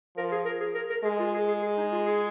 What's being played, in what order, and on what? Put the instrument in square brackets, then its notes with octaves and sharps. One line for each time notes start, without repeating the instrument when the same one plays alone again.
[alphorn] F3 [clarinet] A#4
[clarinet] G#4
A#4
G#4
A#4
A#4
[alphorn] G#3 [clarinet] G#4
[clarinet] F4
G#4
G#4
G#4
D#4
F4
G#4